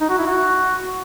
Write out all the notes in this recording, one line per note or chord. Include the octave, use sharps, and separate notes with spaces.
D#4
F#4
E4
F#4